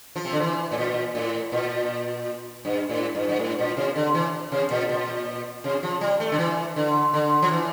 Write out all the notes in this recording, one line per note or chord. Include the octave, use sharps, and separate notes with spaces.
F3
C3
D3
E3
A2
A#2
A2
A#2
G2
A2
G2
G2
A2
A#2
C3
D3
E3
C3
A#2
A#2
C3
F3
G3
A3
D3
E3
D3
D3
F3
E3